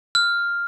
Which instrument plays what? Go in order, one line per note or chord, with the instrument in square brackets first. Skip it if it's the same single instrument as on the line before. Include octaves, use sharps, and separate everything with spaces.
[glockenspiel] F6